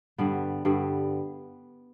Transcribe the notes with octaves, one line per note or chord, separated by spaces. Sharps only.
G2 D3 G3 B3
G2 D3 G3 B3